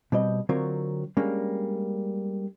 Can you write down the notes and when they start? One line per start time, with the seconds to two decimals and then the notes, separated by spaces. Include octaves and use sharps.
0.12 B2 G3 C4 D#5
0.49 D3 F#3 C4 F4 A#4 C#5
1.17 G3 G#3 A#3 C#4 D4